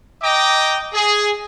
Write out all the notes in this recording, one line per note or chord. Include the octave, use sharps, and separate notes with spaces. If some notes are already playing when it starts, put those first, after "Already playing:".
D#5 G5 A#5 D6
G#4